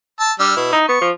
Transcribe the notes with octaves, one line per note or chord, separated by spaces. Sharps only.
A5 E6
G3 D4 E6 F6
B2 E4
D#4
B3 C#6
F3